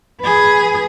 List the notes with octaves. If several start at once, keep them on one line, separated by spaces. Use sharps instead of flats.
G#4 B4